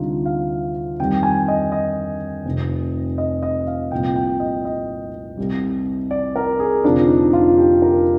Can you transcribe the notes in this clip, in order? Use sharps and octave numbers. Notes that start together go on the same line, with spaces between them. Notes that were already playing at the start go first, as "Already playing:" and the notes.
Already playing: D2 C3 G3 D#4 F4
F5
F2 D#3 G3 G5
G#5
D#5
D#5
F1 F2 C3
D#5
D#5
F5
C2 A#2 F3 G5
G5
D#5
D#5
C2 C3 G3
D5
A#4
G#4
F1 F2 D3 F3 D4
D#4
F4
G4
A#4